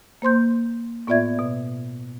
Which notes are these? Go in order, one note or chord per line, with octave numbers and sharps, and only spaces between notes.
A#3 C5 C6 G6
A2 B3 F4 D5 E5 G#6
B2